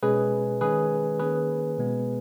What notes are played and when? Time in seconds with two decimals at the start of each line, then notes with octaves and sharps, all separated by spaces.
0.03 B2 G#3 C#4 G#4 B4
0.61 D#3 G#3 C#4 G#4 B4
1.19 D#3 A#3 C#4 G#4 B4
1.78 B2 G#3 B3